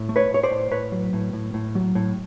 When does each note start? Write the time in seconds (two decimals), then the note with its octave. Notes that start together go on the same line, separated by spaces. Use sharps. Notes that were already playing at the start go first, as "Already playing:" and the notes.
Already playing: A2
0.09 A3
0.16 B4 C#5
0.30 A2 C#5
0.43 C5 D5
0.51 A2
0.71 A2 B4 C#5
0.92 F#3
1.13 A2
1.33 A2
1.54 A2
1.75 F#3
1.95 A2